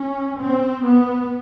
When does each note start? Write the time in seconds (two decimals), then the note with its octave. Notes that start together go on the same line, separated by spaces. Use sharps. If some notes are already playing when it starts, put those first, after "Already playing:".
Already playing: C#4
0.40 C4
0.84 B3